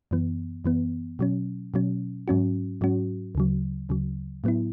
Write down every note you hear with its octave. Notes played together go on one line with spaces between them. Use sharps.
F#2 E3 B3
F#2 E3 B3
B2 F#3 C#4
B2 F#3 C#4
G#2 F#3 C#4 F#4
G#2 F#3 C#4 F#4
D2 C#3 F#3
D2 C#3 F#3
A2 F#3 B3 E4